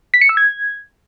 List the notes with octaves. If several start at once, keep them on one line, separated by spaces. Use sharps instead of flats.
B6
C#7
E6
G#6